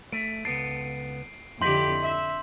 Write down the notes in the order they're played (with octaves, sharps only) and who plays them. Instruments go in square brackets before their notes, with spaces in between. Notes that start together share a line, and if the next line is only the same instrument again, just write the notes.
[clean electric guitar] A3 [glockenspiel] D7 D#7
[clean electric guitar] C#2 B3 A4 [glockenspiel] C7 D7
[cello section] F2 D3 G4 [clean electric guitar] E4 D#5 [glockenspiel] C6 G6 F#7
[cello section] E5